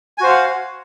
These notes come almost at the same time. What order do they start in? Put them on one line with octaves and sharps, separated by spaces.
G#5 F#4 C5 F5 F#5